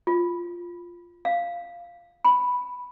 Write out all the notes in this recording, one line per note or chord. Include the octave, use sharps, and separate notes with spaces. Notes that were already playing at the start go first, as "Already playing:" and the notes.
F4
F5
B5